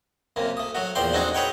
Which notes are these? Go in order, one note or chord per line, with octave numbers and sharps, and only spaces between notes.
F#2 C3 A#3
A3 D#6
F#3 A3 F#4
E2 A#2 F3 D5 G5 C6
A3 C4 D4 D#4 F#4 G#4
G#4 B4 C#5 F#5 G5